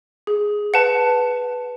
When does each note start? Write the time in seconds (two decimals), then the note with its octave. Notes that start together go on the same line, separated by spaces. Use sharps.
0.27 G#4
0.74 B4 F#5 A5